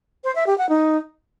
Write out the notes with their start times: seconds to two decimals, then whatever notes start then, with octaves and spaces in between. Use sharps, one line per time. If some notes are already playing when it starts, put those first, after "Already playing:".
0.24 C5
0.35 E5
0.47 G4
0.58 F#5
0.69 D#4